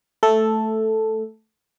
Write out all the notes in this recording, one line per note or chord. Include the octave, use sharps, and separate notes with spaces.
A3 A4